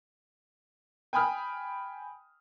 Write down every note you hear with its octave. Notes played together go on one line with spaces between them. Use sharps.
G5 G#5 B5 D#6 F6